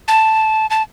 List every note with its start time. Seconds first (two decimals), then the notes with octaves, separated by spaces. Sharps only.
0.08 A5
0.70 A5